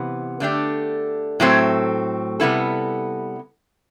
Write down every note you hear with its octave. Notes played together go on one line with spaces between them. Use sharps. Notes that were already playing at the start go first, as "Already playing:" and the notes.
Already playing: C3 E3 B3
D3 A3 D4 G4
A2 F#3 A3 C4
C3 G3 B3 E4 A4